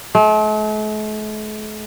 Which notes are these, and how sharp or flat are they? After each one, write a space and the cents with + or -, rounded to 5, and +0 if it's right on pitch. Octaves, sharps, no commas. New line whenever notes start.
A3 -45